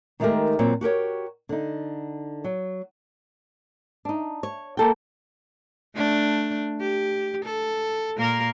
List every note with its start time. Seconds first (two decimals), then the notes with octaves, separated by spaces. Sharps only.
0.20 D#3 G#3 A3 D#4 G4 A#4
0.59 A#2 F#3 C4
0.81 F#4 G4 A#4 C#5
1.49 D3 D#4
2.44 F#3
4.05 D4 D#4
4.43 C#5
4.77 A#3 A4 G5
5.95 A3 D4
6.80 G4
7.44 A4
8.17 A#2 A#3 A#4